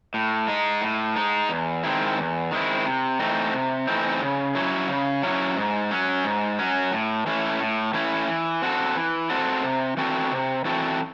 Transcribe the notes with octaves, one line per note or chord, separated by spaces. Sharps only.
A2
G#3 D#4
A2
G#3 D#4
E2
D#3 G#3 C4 E4
E2
D#3 G#3 C4 E4
C3
E3 A3 C4 D#4
C3
E3 A3 C4 D#4
C#3
F#3 C#4 E4
C#3
F#3 C#4 E4
G#2
F#3 C#4
G#2
F#3 C#4
A2
E3 A3 C#4 E4
A2
E3 A3 C#4 E4
E3
C4 F#4 A4
E3
C4 F#4 A4
C3
E3 C4 F#4 A4
C3
E3 C4 F#4 A4